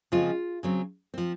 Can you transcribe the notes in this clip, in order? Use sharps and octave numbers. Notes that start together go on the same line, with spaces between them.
C#3 F3 G#3 C4 F4
C#3 F#3 C4
F3 C4